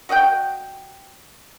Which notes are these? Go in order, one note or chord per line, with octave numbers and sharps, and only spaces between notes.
F#4 D#5 F#5 G5